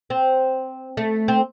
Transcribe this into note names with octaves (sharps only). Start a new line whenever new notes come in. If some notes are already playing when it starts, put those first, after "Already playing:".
C4
A3
C4